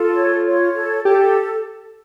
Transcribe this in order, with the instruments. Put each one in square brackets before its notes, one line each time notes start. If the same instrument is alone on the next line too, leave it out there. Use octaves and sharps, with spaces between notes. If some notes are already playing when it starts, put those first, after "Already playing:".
Already playing: [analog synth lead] F4 [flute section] A4
[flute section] C#5
C#5
A4
[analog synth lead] G4 [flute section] A4